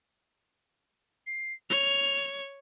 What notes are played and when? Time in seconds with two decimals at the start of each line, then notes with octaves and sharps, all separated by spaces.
1.27 C7
1.70 C#5 F7